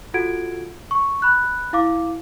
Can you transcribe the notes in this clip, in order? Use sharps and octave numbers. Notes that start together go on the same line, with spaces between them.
F4 F#4 A4 F#5 G#6 D7
C#6
B5 F#6
E4 F5 D6